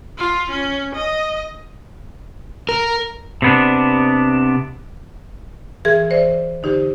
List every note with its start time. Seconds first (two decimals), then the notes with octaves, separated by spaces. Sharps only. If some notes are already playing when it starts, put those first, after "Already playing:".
0.18 F4
0.50 C#4
0.95 D#5
2.69 A#4
3.42 C3 B3 D4
5.85 E3 G#4 A#4 G#6
6.10 E3 C5 D5
6.63 D3 D#4 G4 C5